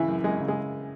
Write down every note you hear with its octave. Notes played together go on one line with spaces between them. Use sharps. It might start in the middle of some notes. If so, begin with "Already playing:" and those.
Already playing: C#3 E3 E4
F#2
F#2 G#3
C#3
G#3